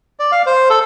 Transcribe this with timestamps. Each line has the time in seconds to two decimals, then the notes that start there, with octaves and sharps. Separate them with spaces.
0.19 D5
0.32 F5
0.46 C5
0.70 A4